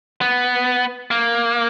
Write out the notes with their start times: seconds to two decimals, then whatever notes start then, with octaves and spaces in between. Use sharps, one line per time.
0.21 B3
1.11 A#3